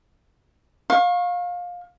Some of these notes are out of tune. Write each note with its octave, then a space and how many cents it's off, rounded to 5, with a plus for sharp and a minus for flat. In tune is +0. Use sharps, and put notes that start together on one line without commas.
F5 +25 C#6 -25